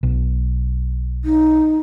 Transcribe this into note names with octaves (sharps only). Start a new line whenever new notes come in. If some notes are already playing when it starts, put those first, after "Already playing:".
B1
D#4